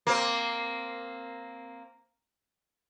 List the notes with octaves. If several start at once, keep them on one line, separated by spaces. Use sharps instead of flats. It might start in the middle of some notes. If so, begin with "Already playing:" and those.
A#3 C4